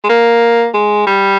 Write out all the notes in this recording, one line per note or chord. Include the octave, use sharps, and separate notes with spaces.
G#3
A#3
G#3
G3